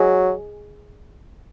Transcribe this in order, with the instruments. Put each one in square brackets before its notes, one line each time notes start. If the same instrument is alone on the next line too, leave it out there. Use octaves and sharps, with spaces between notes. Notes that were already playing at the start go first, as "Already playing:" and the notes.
Already playing: [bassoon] F#3 [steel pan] G#4 D#5 G#5